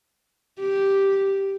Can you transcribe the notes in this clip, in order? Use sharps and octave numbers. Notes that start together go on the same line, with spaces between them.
G4